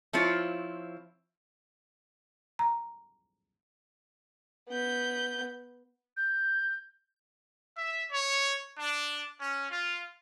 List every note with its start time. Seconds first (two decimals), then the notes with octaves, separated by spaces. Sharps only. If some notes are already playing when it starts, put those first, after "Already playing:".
0.13 F3 C4 E4 F4 C#5
2.59 A#5
4.69 B3 G6
6.17 G6
7.77 E5
8.12 C#5
8.79 D4
9.40 C#4
9.71 F4